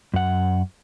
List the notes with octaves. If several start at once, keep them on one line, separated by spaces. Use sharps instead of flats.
F#2 F#5